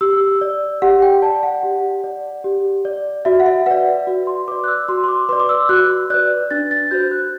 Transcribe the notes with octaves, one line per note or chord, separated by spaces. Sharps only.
G4 E6
D5
G4 F#5
G5
D5 A5
F#5
G4
D5
G4
D5
F#4 E5
F#5
E5
B4 D5 F#5
F#4
C6
B4 D5 D6
F#6
E6
F#4 C6
C6
D6
B4 D5 C6
D6
E6
F#4 F#6
B4 D5 F#6
D4 A6
A6
F#4 C5 G6
F#6